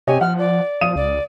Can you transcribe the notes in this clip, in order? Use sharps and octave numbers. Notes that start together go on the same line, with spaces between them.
C3 G4 C#5 D#5 G#5
F3 F#5 F6
D5
F3 F5 D#6 D#7
C#2 D5